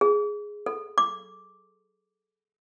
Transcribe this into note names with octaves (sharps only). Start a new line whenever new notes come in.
G#4
A4
D6